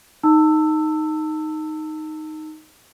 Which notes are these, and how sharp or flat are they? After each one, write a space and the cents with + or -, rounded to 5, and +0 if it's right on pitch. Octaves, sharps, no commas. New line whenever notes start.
D#4 +0 A5 +35 E6 +0